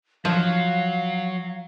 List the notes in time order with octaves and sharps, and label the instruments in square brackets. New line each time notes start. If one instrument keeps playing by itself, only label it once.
[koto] F3 [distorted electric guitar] F#3 [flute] F5